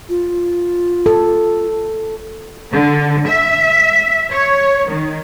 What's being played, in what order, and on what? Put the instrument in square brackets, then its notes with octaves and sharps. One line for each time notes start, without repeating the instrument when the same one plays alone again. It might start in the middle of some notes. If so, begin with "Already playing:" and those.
[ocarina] F4
[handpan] A4
[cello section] D3
E5
C#5
D#3